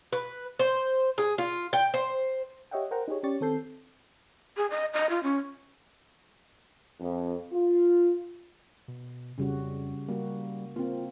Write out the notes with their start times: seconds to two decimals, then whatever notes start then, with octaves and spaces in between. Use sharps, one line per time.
0.13 B4
0.59 C5
1.18 G#4
1.38 F4
1.73 G5
1.94 C5
2.71 G4 C#5 D#5 E5 F#5 G5
2.91 A#4 C5 F#5 G5 A#5
3.08 D#4 G4 G#4 C#5
3.23 C#4 G4 C#5 D5 C#6 A6
3.41 D#3 C4 A4 G6 C7
4.57 G#4
4.71 D#5
4.93 D#5
5.10 F4
5.23 C#4
7.00 F2
7.52 F4
8.88 B2
9.38 F2 C#3 G3 F#4
10.08 G3 A#3 F#4
10.76 A#3 C4 F4